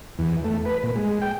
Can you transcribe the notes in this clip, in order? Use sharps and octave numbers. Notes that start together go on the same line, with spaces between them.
E2
A3
B4
A#2
G#3
G5